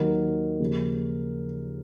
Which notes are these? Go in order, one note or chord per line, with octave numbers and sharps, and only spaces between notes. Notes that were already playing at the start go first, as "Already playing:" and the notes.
Already playing: D#2 D#3 F#3 A#4
D#2 C#3 F3